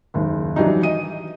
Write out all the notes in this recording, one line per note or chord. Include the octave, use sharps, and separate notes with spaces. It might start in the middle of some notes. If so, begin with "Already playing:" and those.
F#1 D#2
E3 F#3 G3 D4 D#4
D#5 D#7